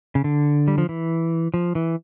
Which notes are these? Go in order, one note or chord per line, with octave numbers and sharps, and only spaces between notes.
C#3
D3
G3
F3
E3
F3
E3